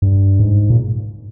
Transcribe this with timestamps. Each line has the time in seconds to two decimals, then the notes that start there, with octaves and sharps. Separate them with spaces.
0.02 G2
0.40 G#2
0.70 A#2